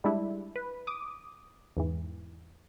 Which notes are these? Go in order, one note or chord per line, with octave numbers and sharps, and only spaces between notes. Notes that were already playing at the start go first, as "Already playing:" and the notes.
G3 G#3 D4 E4
B4
D6 D#6
E2 G#2 E3